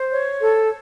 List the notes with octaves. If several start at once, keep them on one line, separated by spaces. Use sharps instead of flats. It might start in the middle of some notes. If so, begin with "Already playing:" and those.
Already playing: C5
C#5
A4